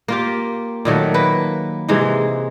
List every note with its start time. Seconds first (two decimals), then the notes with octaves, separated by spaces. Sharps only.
0.08 A#3 F4 G4
0.85 A#2 D#3 F#3 A3
1.14 A#3 B4
1.88 G#2 C3 E3 G#3